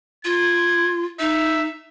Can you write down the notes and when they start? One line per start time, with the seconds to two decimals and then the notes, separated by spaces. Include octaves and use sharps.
0.25 F4 G#6
1.19 D#4 E5